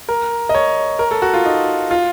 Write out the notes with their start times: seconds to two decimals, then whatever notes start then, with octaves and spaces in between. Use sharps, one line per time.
0.09 A#4
0.49 D#5
0.55 C#5
0.99 A#4
1.11 A4
1.22 F#4
1.34 F4
1.45 D#4
1.91 F4